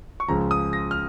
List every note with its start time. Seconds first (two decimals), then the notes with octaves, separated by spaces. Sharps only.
0.20 C#6
0.28 C#2 C#3 F3 A#5
0.51 D#6
0.73 A#6
0.91 F6